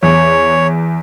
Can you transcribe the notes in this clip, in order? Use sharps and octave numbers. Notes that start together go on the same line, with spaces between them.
E2 C#5